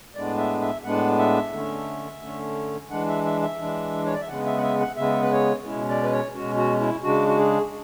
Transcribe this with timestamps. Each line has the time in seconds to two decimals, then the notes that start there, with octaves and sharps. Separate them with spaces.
0.15 A2 G#3 B3 D4 D5
0.38 E5
0.61 E5
0.84 A2 G#3 B3 D4 F#5
1.19 E5
1.53 D3 A3 C#4
2.22 D3 A3 C#4
2.91 E3 G#3 D4 F#5
3.08 E5
3.25 E5
3.42 E5
3.59 E3 G#3 D4
4.06 C#5
4.14 D5
4.21 E5
4.28 C#3 G#3 B3 F#5
4.46 E5
4.57 F#5
4.63 E5
4.80 F#5
4.97 C#3 G#3 B3 E5
5.22 B4
5.31 C#5
5.66 B2 G#3 C#4 E4
5.89 D5
6.03 B4
6.12 C#5
6.35 B2 G#3 C#4 F#4
6.57 F#4
6.80 E4
7.03 C#3 G#3 D4 F#4
7.28 F#4
7.38 G#4